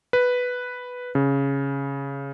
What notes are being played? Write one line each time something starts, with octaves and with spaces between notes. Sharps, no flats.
B4
C#3